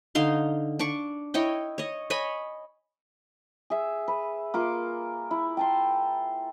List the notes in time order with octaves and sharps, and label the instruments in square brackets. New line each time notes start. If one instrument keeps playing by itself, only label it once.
[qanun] D3 D#4 F5 C6
D4 D5 C#6
E4 C#5 D#5 G5
C#5 D#5
C#5 D#5 G#5 B5
[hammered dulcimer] G#4 E5
B4
A#3 F4 D6
E4
G5 A5 C6